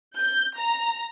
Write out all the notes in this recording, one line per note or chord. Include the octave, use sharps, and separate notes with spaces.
G6
A#5